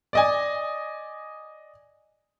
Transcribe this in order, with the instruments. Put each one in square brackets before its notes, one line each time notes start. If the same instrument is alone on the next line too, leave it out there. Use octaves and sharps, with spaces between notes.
[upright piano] D5 D#5 G#5